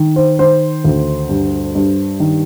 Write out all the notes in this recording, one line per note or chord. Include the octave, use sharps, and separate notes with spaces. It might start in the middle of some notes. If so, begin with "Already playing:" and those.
Already playing: D#3
C5
D#3 C5
D2
G2
G2
D#3